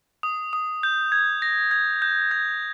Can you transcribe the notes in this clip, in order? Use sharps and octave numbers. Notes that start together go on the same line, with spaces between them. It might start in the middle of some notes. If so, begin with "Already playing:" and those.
D#6
D#6
G6
G#6
A#6
G#6
G6
G#6